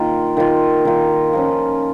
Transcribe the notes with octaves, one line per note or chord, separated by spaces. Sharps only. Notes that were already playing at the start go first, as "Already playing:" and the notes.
Already playing: D#3 A#3 F4
D#3 A#3 F4
D#3 A#3 F4
F3 A#3 C#4